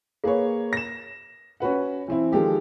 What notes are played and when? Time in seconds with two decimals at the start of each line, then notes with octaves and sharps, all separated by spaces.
0.24 A#3 G#4 B4 C#5
0.73 A#6 E7
1.60 C#4 F#4 B4 F#5
2.08 E3 C4 E4
2.31 D#3 F3 G#3 G4 A4